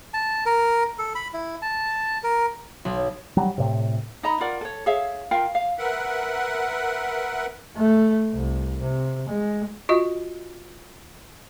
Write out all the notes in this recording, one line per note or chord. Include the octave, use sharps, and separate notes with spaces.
A5
A#4
A4
B5
E4
A5
A#4
B1
F#3 G3
A2 C3
D#4 D#5 A#5 B5
F4 A#4 D5 F#5
A4 C#5
G#4 C#5 E5 F5
F4 A#4 F5 G5
F5
A#4 B4 E5 F#5
A3
C2
C3
G#3
F4 F#4 D#5